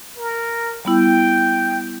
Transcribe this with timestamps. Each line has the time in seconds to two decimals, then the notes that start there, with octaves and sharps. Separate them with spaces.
0.17 A#4
0.85 G3 B3 E4 G5